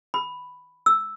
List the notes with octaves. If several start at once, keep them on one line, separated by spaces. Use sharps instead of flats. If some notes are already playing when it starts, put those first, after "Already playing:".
B5
E6